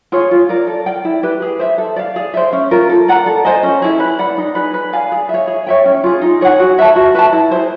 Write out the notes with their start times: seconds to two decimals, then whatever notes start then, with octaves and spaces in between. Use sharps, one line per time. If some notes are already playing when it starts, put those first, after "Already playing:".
0.12 F4 G#4 C#5
0.31 F4
0.49 A#4 D5
0.67 A4
0.86 D5 G5
1.05 E4
1.23 G4 B4
1.42 G#4
1.59 C5 E5
1.78 A4
1.96 D5 F5
2.16 G#4
2.34 C5 E5
2.53 C#4
2.71 F4 A#4
2.89 A4
3.08 D5 F#5 A#5
3.26 A4
3.45 C5 D#5 G#5
3.63 C#4
3.82 E4 G#4
4.00 B4
4.19 D5 F#5 B5
4.38 D#4
4.55 G#4 B4
4.74 B4
4.93 D5 F5 G#5
5.12 G#4
5.29 C#5 E5
5.47 G#4
5.67 C#5 E5 G5
5.86 C#4
6.04 F4 G#4
6.21 D#4
6.41 G#4 C#5 F#5
6.60 F#4
6.78 B4 E5 A5
6.96 F#4
7.15 B4 E5 A5
7.32 E4
7.51 G#4 C5